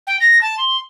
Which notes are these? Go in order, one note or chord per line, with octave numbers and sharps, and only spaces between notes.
G5
A#6
A5
C6